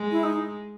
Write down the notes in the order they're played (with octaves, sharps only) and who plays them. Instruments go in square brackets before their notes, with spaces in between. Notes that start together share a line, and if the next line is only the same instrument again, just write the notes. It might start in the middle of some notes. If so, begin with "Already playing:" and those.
Already playing: [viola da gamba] G#3
[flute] E4
D#4